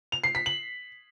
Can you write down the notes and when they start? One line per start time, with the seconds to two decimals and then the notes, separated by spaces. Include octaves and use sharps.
0.12 F7
0.24 C7
0.35 B6
0.46 F#7